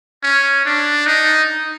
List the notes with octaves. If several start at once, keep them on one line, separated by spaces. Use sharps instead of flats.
C#4
D4
D#4